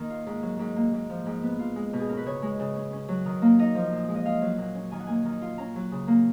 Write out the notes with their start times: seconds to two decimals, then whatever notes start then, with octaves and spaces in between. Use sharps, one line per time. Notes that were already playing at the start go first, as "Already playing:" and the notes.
Already playing: D#3 A#3 A#4
0.10 F4
0.26 G#2
0.43 F#3
0.59 G#2
0.76 A#3
0.94 G#2
1.10 F3
1.26 G#2
1.43 B3
1.59 F4
1.76 G#3
1.93 B2
2.00 G#4
2.09 C#4 A#4
2.17 B4
2.26 C#3 C#5
2.42 G#3
2.59 C#3
2.76 C#4
2.93 C#4
3.09 F#3
3.26 D#3
3.42 A#3
3.59 D#4 D#5
3.75 F3
3.92 A#2
4.08 G#3
4.15 D#5
4.25 F4 F5
4.42 F#3
4.58 A#2 F#5
4.75 C#4
4.91 D#3 G#5
4.99 F#5
5.07 A#3 G#5
5.25 D#3
5.42 F4
5.58 C#4 A#5
5.76 F#3
5.92 C#3
6.08 A#3